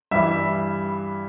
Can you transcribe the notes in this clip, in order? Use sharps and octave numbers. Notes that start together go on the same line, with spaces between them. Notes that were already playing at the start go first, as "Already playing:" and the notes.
G2 E3 G3 E5